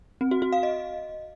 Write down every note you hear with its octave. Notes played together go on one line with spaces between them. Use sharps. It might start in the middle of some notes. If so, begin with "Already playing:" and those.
C4
F#4
F#4
F5
D#5